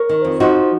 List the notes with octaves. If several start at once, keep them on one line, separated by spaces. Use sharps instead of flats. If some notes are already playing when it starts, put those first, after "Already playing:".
Already playing: A#4 C#5
D#3
F2
F3 D#4 F#4